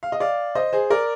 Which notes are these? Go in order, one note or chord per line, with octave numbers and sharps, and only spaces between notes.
F5
D#5
D5 F5
C5 D#5
G#4 C5
A#4 D5